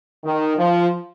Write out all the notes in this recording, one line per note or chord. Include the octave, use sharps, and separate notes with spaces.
D#3
F3